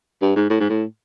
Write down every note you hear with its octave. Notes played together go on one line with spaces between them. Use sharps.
G2
G#2
A2
G#2
A2